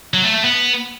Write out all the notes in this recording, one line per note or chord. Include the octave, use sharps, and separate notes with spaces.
F#3
A3
A3
B3